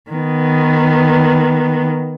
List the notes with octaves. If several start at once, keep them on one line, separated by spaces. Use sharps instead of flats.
D#3 B3